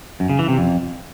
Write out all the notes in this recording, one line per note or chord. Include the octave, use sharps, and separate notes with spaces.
F#2
C#3
E3
C3
F2